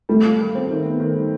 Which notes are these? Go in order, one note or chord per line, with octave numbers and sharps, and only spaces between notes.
G3 A3
F4
G3
C4
D#3
B3
D#3
G3